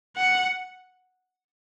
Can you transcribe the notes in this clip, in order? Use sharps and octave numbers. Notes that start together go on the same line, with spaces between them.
F#5